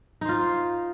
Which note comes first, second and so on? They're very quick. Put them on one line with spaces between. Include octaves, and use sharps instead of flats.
D#4 C5 F4